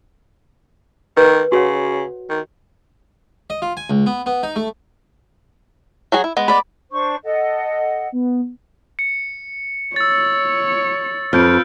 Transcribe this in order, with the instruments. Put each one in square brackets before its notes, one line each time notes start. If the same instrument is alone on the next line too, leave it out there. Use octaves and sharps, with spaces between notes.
[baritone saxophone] D#3 [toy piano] B4
[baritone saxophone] C#3 [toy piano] F#4 C#5 F#5
[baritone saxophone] D#3
[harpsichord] D#5
F4
G#5
C#2
B3
B3
D#4
A3
[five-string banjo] F#3 F#4 G#4
E4
G#3 B3
[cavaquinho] D5 B5
[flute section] D4 C5 C#6
A4 D#5 F#5
[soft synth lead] B3
[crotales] C#7
[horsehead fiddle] C#5 [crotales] E6 A6
[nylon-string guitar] F2 [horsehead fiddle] F4 B4 [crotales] F6 G6 D7